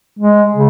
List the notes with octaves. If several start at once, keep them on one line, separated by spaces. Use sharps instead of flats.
G#3
C#3